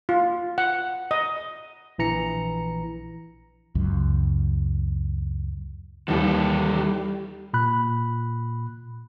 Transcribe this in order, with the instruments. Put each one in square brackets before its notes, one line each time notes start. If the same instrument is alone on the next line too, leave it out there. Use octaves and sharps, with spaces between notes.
[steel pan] F4
F#5
D#5
[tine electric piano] A#1 E3 A#5 C#7
[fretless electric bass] C#2 F#2
[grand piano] D#2 E3 [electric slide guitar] D#3 A4 [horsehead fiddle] G3
[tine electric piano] A#2 B5 F#6